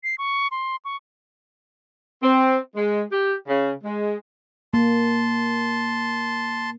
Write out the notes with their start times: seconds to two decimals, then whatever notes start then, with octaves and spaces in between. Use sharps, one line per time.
0.04 C7
0.18 C#6
0.51 C6
0.85 C#6
2.23 C4
2.76 G#3
3.11 G4
3.48 C#3
3.84 G#3
4.74 A#3 A5 C6